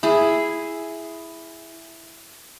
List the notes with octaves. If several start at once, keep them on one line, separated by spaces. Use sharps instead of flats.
E4 G#4